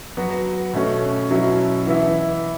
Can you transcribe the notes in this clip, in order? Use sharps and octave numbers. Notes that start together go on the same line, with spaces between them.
F#3 B3 F#4
B2 A3 C#4
B2 F#3 C#4 E4
E3 B3 E4